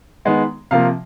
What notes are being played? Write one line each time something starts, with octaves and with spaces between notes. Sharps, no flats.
D#3 G#3 B3
C3 F3 A#3 F5